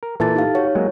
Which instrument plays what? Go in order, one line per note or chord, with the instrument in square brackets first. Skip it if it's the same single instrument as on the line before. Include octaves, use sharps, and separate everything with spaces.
[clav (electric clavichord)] A#4
[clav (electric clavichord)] A#2 E3 [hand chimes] A4 A5 A6
[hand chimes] D#4 G4 F5
[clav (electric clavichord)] F#4 [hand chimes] C#5
[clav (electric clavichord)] F#3 G#3 A#3